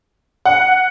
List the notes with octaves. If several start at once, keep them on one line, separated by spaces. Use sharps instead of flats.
F#5